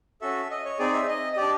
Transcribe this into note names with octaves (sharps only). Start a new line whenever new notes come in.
C#4 F#4 A4 E5
D#5
C#5
C4 D#4 G#4 D5
E5
D#5
D#5
D4 G4 D5